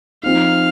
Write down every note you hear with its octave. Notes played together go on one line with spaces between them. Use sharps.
F3 C4 D#4 F5